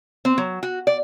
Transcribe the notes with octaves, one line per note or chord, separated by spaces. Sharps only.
C4
F#3
F#4
D5